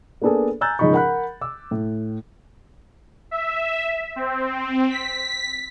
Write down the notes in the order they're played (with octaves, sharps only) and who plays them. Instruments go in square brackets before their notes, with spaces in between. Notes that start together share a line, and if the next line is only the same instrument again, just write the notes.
[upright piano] A#3 B3 D4 G#4 A4
G#5 A#5 E6 F#6 G6 A6
G#2 C#3 F3 D#4 B5 C#6
A#4 F#5 B5 F#6
D6 E6
A2
[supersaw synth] E5
C4
B6